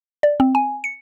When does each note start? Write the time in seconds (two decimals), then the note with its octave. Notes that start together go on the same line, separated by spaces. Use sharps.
0.23 D5
0.40 C4
0.55 G#5
0.84 C#7